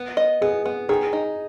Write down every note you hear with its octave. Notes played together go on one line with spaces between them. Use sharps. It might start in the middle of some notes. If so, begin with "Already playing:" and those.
Already playing: B3
D#5
B3 G#4
B3
D#3 G#4
D#4